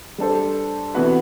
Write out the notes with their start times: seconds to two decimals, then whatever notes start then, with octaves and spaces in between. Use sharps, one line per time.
0.18 G3 D4 A4 C5
0.94 C3 E3 B3 F#4 B4